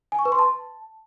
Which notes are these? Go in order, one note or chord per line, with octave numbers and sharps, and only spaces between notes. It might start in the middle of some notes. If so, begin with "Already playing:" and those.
G#5
C#6
B4
C6
A5